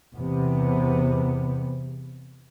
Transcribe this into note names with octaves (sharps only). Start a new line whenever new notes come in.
E2 C3 B3